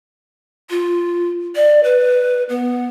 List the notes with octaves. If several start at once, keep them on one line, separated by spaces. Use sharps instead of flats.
F4
D5
B4
B3